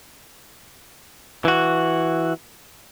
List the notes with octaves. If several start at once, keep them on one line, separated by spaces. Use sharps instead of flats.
E3 F#4